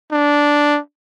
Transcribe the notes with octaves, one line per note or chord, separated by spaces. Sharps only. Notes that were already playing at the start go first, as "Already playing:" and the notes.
D4